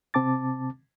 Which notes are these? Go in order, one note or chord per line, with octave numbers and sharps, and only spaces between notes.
C3 C4 A5 D6 A6